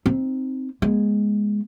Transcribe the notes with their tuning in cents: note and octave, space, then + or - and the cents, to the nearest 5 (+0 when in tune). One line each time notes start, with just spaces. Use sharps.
C4 +0 D#4 +0
G#3 +0 B3 -40